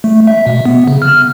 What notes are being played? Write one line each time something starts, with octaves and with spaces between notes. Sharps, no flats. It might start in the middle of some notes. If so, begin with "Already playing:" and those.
A3
E5
B2
B3
C#3
F6